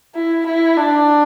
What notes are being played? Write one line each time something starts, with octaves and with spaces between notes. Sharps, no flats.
E4
E4
D4